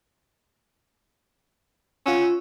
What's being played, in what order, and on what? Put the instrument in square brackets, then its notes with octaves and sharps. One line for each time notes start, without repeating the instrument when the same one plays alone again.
[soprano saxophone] C#4 [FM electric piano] F4 F#5 E6